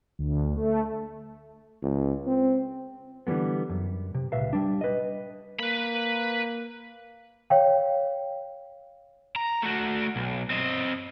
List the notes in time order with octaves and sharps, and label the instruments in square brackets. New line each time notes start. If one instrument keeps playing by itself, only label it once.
[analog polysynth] D2
A3
[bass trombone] C#2
C4
[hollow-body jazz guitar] D3 E3 G3 G#3 B3
F#2
C3
C#2 A#2 B4 E5 F5
G3 D4
B4 D#5
[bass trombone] A#3 [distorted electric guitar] B4 B5
[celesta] C#5 F5 G5
[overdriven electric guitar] A#5
A3 F#4
B1
C4 D#5